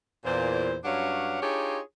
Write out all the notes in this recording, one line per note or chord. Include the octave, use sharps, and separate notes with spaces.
E2 A#2 C5
G2 F#3 C#4 D4 F5 F#5
D4 D#4 F4 G4 G#4 C#5